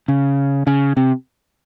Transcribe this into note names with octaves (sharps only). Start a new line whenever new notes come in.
C#3
C#3
C3